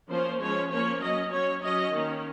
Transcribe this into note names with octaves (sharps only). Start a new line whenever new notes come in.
F3 A#3 C#4 C5
F3 G#3 C#4 C#5
F3 A#3 C#4 C#5
F#3 C#4 D#5
F#3 C#4 C#5
F#3 C#4 D#5
D#3 A#3 C#4